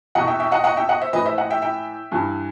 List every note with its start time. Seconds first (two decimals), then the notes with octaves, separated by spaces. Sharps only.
0.15 E2 B2 D#5 F#5
0.28 E5 G5
0.40 E5 G5
0.52 D#5 F#5
0.64 D#5 F#5
0.77 E5 G5
0.89 D#5 F#5
1.01 C5 E5
1.13 A2 E3 B4 D#5
1.25 C5 E5
1.38 D#5 F#5
1.50 E5 G5
1.62 E5 G5
2.12 G2 E3